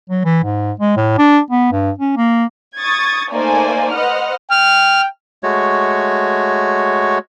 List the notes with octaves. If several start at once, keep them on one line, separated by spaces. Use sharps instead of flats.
F#3
E3
G#2
G#3
A2
D4
B3
G2
C#4
A#3
C#6 D#6 G#6 A6
A3 A#3 D#4 C5 D5 G#5
B4 C5 D#5 F#5 F6
G5 F6
G#3 A3 F#4 C#5